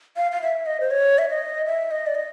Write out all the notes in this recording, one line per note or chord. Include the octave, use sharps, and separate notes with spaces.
F5
F5
E5
D#5
C5
C#5
E5
D#5
E5
D#5
D5
D#5